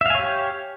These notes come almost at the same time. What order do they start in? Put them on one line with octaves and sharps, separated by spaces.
E5 F5 G#5 C#5 G4